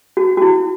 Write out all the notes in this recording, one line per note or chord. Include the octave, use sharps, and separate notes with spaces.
F#4
F#4
E4